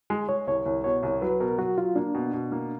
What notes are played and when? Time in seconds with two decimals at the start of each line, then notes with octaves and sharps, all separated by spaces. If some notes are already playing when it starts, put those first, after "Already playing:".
0.10 G#3
0.28 G#3 C#5
0.47 C2 C#5
0.66 C2
0.84 B2 C#5
1.03 C2
1.21 F#3 B4
1.40 B2 A#4
1.58 F#3 F#4
1.77 F#3 F4
1.96 A#3 D4
2.15 B2
2.33 B2
2.52 A#3